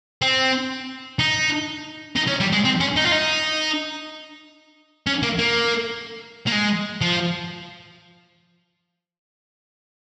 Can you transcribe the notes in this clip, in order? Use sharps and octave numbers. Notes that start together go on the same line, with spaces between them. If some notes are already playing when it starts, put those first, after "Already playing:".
C4
D#4
D#4
C#4
G3
G#3
C4
C#4
D#4
F4
D#4
C#4
A#3
A#3
A#3
G#3
F3